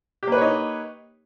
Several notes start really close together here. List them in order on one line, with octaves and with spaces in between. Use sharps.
G4 A#3 B4 C#5 D#4